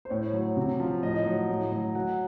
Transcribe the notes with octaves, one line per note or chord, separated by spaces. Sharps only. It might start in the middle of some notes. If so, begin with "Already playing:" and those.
C5
A2 C#5
F#3
C3
F3
A2 D#5
F#3
A2
F#3
F#3 F#5